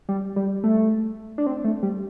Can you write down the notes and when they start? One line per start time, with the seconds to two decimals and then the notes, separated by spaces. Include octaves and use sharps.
0.09 G3
0.36 G3
0.64 A3
1.38 D4
1.47 C4
1.64 A3
1.83 G3